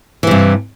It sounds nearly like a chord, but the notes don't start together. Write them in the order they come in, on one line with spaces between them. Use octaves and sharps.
E3 C3 G2